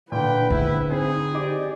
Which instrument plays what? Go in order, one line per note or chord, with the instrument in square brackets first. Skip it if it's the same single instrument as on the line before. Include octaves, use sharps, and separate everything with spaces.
[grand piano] A#2 D3 [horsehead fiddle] B4 [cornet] G5
[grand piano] G#2 [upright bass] D3 [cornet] E4
[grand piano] C4 [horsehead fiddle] D#4 [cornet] G#4
[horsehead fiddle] G4 D5 [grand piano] D#5 D6